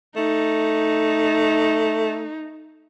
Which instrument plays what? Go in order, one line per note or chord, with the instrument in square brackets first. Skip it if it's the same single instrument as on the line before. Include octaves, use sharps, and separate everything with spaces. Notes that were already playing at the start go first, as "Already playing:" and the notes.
[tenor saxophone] A3 [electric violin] D#4